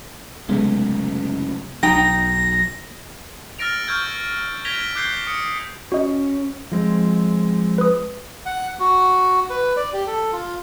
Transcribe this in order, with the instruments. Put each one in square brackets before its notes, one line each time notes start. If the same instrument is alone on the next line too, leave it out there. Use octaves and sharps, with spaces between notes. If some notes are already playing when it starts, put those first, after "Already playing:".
[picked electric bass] F#1 F#2 A3 [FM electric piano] C3 G#3 B3
[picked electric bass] B1 F#3 [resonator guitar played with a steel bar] D#4 G5 [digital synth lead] A#6
[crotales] E6 F6 A6 A#6 D7 F7
C#6 E6 F6 G6 G#6
G#6 A#6 B6 D7 F7 G7
D6 F#6 G6 C7 G7
D#6 C#7
[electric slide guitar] C#4 [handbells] F#4 D#5
[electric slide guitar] F3 G#3 C4
[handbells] B4 D#6
[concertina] F#5
F#4
B4
D5
G4
A4
F4